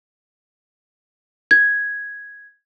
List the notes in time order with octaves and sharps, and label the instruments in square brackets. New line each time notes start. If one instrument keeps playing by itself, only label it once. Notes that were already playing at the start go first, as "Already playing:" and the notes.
[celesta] G#6